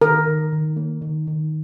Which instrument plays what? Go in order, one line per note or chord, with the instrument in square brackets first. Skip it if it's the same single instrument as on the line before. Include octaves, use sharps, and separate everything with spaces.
[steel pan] D#3 A#4
D#3
D#3
A#3
D#3
D#3